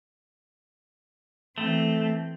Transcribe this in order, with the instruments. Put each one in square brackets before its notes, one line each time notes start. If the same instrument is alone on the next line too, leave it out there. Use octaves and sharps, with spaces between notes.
[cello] E3 C4 [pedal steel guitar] A3